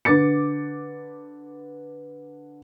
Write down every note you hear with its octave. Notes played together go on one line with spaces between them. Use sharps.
D3 B4 D6 A6 C#7